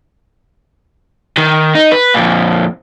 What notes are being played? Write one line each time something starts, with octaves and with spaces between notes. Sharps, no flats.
D#3
D#4
B4
F2 A#2